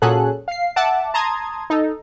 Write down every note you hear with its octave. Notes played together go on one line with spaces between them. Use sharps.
A#2 F#3 C#4 G#4 A4 F#6
F5 C7
E5 F#5 A5 D6
A5 A#5 C6 D#6 G#6
D#4 A4